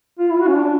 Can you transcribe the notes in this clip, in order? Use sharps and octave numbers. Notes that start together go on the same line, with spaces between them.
F4
E4
F4
F#4
C#4
D4